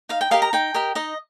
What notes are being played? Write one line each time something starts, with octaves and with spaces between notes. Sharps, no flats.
D#4 F5
G5
G4 A#4 D#5 F5
A#5
D#4 G5
G4 A#4 D#5
D#4 D#5